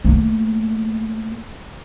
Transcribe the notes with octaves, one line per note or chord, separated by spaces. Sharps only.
A3 A#3